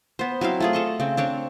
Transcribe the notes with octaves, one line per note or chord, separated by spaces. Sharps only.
B3 C5
F#3 C4 E4 F5
A3 F4 G#4
A4 D#5 C#6
C#3 C4
C4 D4 C#5